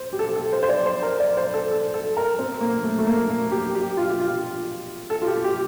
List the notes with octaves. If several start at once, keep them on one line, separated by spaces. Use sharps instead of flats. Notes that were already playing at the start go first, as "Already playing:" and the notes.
Already playing: C5
G4
A4
A4
C5
C5
D5
C5
A#4
D5
C5
A4
A4
A4
A#4
C4
A#3
A3
A3
A#3
A#3
G4
G4
F4
G4
F4
A4
F4
G4
G4